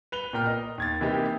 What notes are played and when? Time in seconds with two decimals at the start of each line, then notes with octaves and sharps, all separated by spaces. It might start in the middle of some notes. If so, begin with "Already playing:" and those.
0.12 B4 F7 G7
0.33 A#2 A#4 G5 F6
0.46 D#5
0.78 D#2 G#6 A6
1.00 C3 E3 A#3 C4 D#4 G4